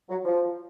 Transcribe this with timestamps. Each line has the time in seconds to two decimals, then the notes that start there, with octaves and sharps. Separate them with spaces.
0.09 F#3
0.25 F3